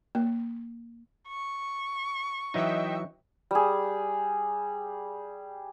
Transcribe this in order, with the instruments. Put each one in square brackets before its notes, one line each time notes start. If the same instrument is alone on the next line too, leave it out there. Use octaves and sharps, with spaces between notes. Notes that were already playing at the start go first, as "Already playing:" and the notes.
[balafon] A#3
[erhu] C#6
[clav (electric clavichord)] E3 F#3 D#4 [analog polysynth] D#5 E5 G5
[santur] G3 G#4